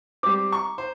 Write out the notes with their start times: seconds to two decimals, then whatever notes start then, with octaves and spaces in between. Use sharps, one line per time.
0.23 G3 C4 D6
0.52 A#5 C#6
0.78 C5